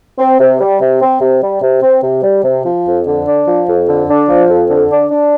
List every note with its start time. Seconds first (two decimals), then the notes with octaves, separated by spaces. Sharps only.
0.19 C4
0.40 C3
0.60 G3
0.80 C3
1.01 C4
1.21 C3
1.42 G3
1.62 C3
1.82 C4
2.03 C3
2.23 G3
2.44 C3
2.65 F3
2.86 F2
3.06 D3
3.26 D4
3.47 F3
3.67 F2
3.88 D3
4.09 D4
4.29 F3
4.49 F2
4.70 D3
4.91 D4
5.11 D4